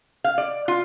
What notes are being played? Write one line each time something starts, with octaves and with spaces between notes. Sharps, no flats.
F5
D5
F4